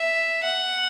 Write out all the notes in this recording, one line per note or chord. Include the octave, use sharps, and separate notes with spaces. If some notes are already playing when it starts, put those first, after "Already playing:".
Already playing: E5
F#5